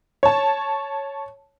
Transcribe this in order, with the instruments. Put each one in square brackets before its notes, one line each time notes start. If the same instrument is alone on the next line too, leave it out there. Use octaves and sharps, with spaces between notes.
[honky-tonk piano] C#5 A5